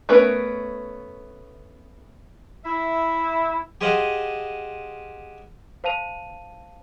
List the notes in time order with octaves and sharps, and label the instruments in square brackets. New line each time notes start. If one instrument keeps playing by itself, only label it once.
[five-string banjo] A3 B3 C#4 A#4 B4
[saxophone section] E4 E5
[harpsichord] G4 G#4 C5 D#5 F5 F#5
[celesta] C5 F5 A5 D#7 F7